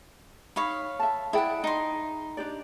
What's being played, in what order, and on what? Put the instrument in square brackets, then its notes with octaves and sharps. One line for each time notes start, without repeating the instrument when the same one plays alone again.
[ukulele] D#4 [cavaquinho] C#5 F5 B5
[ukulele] E5 A5
[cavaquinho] E4 F#5 [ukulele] G#4 D5 G5
[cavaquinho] D#4 C6
[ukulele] D4 G4 D5